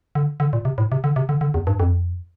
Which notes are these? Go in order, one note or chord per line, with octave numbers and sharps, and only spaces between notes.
D3
D3
A#2
C3
A2
C3
D3
C3
D3
D3
E2
G2
F2